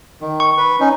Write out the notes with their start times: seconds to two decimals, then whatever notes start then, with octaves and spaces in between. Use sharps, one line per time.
0.21 D#3
0.40 C#6
0.57 B4
0.80 C#4 D#4